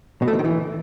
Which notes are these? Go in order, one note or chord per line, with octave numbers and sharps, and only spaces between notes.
B2
A3
E3
D#3
E3